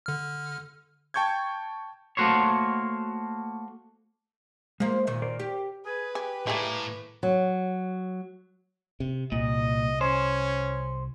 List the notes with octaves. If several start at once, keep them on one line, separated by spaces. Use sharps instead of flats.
D3 F6
G5 A5 C#6 G6 G#6
A3 A#3 F#4 C5 C#5
F3 G#3 A#3
A#2 D#3
A#4 C5 D5
G4
G#4 B4
G4 G#4
A2 G3 A3 A#3 G#4
F#3
C3
C2 A#2 D#5
C#4 C5